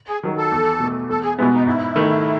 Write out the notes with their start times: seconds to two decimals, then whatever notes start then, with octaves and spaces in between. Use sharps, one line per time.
0.09 G#4
0.23 D#3 F#3
0.37 A4
0.52 E2
0.80 B2 A3
1.09 E2 A4
1.24 G#4
1.38 B2 G#3 B3 E4
1.53 D#4
1.66 G#2 E4
1.96 D#3 A3